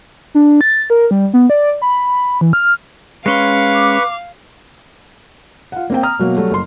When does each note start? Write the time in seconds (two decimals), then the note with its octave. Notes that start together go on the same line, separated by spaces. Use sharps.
0.35 D4
0.61 A6
0.90 A#4
1.11 G3
1.34 B3
1.50 D5
1.82 B5
2.41 E3
2.53 F6
3.26 G#3 C#4 B4 F5 C6 C#6
3.74 D6
5.72 F4 F#5
5.90 A#3 C4 G5
6.03 A#5 D#6 F6
6.19 B2 F#3 A#3
6.37 F#3 G3 A3
6.51 F#1 C6